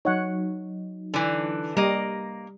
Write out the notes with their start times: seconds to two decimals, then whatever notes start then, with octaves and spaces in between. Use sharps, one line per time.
0.05 F#3 D#4 C#5 F#5
1.14 D3 E3
1.77 G3 A#3 D#5